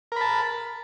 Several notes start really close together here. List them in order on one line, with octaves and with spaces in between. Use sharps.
A#4 B5 A5